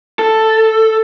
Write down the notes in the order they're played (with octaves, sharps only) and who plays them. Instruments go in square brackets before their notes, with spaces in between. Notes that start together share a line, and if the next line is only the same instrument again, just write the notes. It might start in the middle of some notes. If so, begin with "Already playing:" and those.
[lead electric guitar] A4